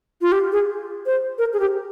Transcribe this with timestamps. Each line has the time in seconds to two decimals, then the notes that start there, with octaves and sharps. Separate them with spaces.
0.21 F4
0.32 G4
0.52 G#4
1.06 C5
1.38 A#4
1.53 G#4
1.59 G4